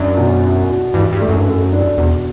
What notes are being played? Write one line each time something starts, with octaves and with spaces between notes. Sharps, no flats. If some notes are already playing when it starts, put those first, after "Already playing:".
Already playing: F#2 D4
B2
F#4
F#4
G2 E3
G2
A3
F#2
G2
F#2 A4
D4
E2 B2